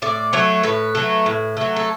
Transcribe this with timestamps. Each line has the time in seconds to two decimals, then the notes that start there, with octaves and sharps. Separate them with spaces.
0.02 A2 D5
0.33 F#3 A3 C#5
0.63 A2 B4
0.95 F#3 A3
1.26 A2
1.57 F#3 A3
1.76 A4